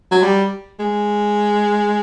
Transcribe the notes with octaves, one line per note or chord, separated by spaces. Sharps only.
F#3
G3
G#3